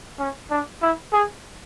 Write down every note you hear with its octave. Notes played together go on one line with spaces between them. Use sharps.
C#4
D4
E4
G#4